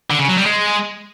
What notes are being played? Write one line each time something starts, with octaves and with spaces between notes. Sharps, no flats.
D3
C#3
F#3
G3
G#3